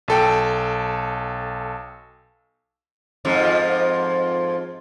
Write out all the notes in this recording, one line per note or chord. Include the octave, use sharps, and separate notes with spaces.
B1 A4 G5
F2 G#2 F3